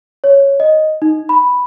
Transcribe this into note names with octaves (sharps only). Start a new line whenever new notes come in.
C#5
D#5
D#4
B5